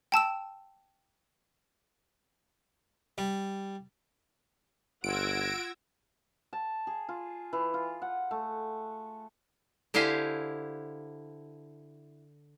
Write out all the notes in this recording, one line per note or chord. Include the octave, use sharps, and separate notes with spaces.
G5 A5 E6 E7
G3
G1 F4 F#5 E6 G#6 A#6 D7
A5
G#4
F4
E3
F4
F#5
A3
D3 E4 G4 C5 F5 G#5